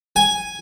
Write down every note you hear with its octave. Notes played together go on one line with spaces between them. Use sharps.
G#5